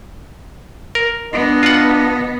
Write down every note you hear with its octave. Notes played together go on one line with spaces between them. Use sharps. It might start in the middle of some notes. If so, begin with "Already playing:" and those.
A#4
B3 D4 D#5
F4 F#5